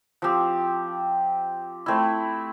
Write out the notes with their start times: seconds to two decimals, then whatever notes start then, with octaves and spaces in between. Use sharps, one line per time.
0.22 F3 C4 G4
1.86 A3 C4 E4